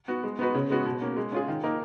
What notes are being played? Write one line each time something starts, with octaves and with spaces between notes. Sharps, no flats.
B3 F#4
G#3
B3 D#4 F#4 B4
C#3
G#3 B3 F#4
B2
A#3 C#4
G#3
C#4 F4 G#4
D#3
A#3 D#4 A#4